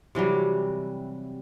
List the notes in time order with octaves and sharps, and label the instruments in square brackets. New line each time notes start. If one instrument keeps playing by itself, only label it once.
[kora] C3 E3 F#3 G3